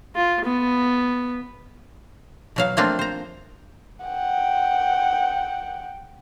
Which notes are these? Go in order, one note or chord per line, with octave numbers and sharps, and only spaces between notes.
F4
B3
B2 F#3 F5
F3 A3 A#3 C4 D4 F4
C5 A#5
F#5 G5